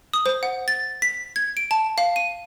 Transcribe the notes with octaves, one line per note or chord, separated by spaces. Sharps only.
D#6
C5
F#5
A6
B6
G#6
D7
A5
F5
D#7